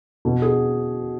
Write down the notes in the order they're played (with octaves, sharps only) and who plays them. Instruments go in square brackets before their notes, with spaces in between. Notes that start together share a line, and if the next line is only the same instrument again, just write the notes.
[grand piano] B2
G#4